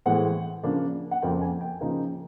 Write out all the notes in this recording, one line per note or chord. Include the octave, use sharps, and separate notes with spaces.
A2 E3 G#3 C4 F#5
C#3 F3 A#3 D4
F#5
F2 C#3 F3 A#3 G5
G#5
G5
C#3 F3 A#3 D#4